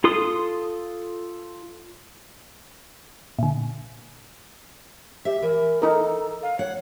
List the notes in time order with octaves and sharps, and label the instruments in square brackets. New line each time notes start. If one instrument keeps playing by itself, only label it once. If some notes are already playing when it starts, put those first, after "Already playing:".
[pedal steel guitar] F4 A4 C6 D#6
[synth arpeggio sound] A#2 D3
[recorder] G4 [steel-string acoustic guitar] E5
[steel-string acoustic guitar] E3 [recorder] A#4
[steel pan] D#4 A#4 [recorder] A4
[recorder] F5
[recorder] C#5 [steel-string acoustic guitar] F#5